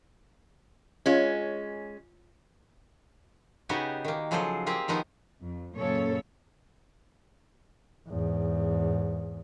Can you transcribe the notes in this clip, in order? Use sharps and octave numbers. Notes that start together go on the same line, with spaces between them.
G#3 C#4 F4 C#5 F5
C#3 B3 D#4 F#4 G4 G#5
D#3 A#3
C#3 F3 F#3 G#4 A4 C5
A#3 C4 G4 G#4
D#3 F3 B3 D#4
F2
F#2 A#2 C#3 A#3 A4 C#5
E2 G#2